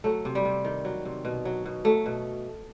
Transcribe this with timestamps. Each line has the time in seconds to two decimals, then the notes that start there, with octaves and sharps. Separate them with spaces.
0.04 F#3 A3
0.25 C3
0.35 G3
0.45 C3
0.65 D#3
0.85 F#3
1.05 C3
1.25 B2
1.45 F#3
1.66 B2
1.85 F#3 A3
2.06 B2